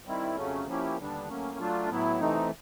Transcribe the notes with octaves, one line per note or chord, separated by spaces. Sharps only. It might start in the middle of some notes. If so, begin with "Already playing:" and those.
D#3 G3 C4 E4
F2 C#3 F#3 A3 C#4
F3 A#3 C#4 E4 G4
D#2 D3 G3 B3 D4
A2 F#3 A#3 C#4
F#3 A3 D4 F4
A2 F#3 B3 E4
C3 E3 A3 C4 D#4